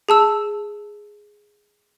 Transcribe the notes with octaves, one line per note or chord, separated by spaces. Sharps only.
G#4 A5 E6